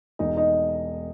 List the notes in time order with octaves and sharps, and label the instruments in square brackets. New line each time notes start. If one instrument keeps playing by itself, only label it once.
[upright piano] E1 D#4 D#5
D#4 D#5